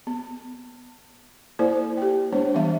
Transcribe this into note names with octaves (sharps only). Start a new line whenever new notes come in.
B3
A#3 E4 A4 C5 D5
G4 G5
G#3 B3 D4 C5 C#5
E3 G3 B3 E5 F5